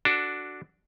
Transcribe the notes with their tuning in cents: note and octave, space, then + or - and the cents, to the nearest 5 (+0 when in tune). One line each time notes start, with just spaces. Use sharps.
D4 +0 F#4 +0 A4 +0